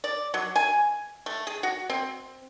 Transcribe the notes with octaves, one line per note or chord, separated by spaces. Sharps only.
D5
F#3
G#5
A3
G#4
F#4
C4